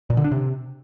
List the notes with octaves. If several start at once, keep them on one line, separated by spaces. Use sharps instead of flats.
A#2
D3
D4
C3